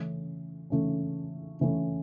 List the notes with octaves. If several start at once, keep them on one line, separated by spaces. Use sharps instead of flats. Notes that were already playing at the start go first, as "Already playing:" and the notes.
Already playing: C#3 E3 A3 C#4
C#3 E3 A3 C#4
C#3 E3 A3 C#4